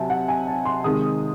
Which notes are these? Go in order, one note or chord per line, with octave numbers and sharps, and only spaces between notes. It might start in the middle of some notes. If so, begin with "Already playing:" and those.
Already playing: C3 F#3 E5 G#5 A5
F#5
G#5
A5
C6
C3 D#3 G#3 D#6